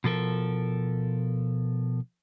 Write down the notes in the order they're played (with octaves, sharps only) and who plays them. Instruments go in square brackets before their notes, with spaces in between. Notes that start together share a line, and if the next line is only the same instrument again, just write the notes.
[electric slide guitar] B2 F3 A4 A#4